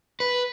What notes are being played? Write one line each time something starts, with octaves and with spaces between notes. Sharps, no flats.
B4